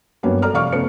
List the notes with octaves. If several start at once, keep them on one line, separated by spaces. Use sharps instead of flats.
G2 F#3 A#3 B3 C#4
A4 D5 A#5 F6
F1 D5 F5 C#6 F6
C#3 A3 B3 C5 C#7